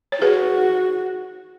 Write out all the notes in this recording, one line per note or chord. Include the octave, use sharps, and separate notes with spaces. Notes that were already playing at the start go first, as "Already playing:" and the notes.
C#5
F#4 G#4 B4